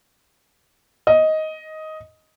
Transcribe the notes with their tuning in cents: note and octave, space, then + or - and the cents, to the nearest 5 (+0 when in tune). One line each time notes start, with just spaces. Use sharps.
D#5 +10